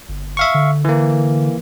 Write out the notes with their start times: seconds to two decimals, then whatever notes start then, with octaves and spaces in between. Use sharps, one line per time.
0.09 G1
0.37 E5 F5 C#6
0.54 D3
0.85 E3 A#3